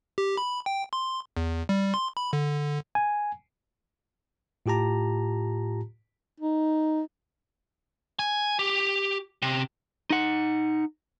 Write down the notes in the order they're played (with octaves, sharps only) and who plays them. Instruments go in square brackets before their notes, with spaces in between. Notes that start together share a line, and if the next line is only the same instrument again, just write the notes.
[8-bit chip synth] G4
B5
G5
C6
E2
G3
C6
B5
D3
[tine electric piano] G#5
A2 F4 G4 A5 A#5
[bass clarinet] D#4
[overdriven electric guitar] G#5
G4
C3
[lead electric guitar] D#4 F#5